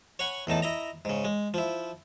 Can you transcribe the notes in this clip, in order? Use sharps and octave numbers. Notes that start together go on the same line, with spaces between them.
C#5 F#5 G#5 B5
E2 A2 D#4 A5
E4 D#5 A#5
G#2 C#3
G#3
F3 E4